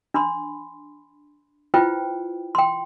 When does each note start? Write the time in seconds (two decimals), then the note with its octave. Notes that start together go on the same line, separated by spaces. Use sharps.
0.14 D4 B5 C6
1.74 E4 F4 B4 C5 G5
2.55 G5 C6